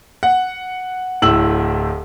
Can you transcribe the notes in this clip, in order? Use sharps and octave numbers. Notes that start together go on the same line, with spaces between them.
F#5
D1 A2 E6 F#7